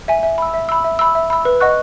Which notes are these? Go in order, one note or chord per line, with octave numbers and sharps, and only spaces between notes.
E5 G#5
E5
B5 E6
E5
B5 E6
E5
B5 E6
E5
B5 E6
B4
D#5 F#5 C#6 F#6